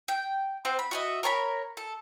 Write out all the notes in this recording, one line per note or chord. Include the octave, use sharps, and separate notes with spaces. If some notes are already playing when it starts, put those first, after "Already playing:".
G5
C4 C5 F#5
B5
F#4 D#5 E5
A#4 C#5 A5 B5
A4